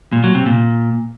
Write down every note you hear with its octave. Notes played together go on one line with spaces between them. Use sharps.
A#2
F#3
C3
A#2